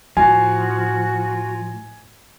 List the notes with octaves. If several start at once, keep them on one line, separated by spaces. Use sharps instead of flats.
A2 F3 F#4 G#5